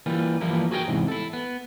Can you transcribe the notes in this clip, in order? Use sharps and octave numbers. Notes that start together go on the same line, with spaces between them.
E3 G3 A#3 F4
E3 F3 G3 A#3 E4
F#4 G#4 A#4 E5 G5
E2 G#2 C3 E3
E4 A4
B3